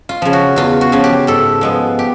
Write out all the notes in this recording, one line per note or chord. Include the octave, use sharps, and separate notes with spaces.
F4
C#3 F3
F#4
E2 F4
F#4
C#3 F3
G4
G#2 A4
F3 G#3 B3
G4